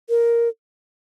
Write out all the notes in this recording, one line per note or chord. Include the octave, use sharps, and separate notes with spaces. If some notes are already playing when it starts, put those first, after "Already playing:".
A#4